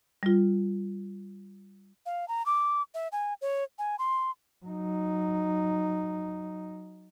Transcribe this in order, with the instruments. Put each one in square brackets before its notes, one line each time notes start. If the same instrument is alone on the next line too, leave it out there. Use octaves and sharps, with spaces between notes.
[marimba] G3 F4
[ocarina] F5
A#5
D6
E5
G#5
C#5
G#5
C6
[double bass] F#3 D#4